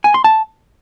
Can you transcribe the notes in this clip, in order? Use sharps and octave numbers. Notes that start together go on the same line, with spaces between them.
G#5
C6
A5